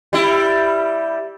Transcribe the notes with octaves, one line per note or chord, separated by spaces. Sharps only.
G3 E4